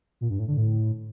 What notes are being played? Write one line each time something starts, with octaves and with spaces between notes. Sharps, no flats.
A#2
G2
A2
D3
A2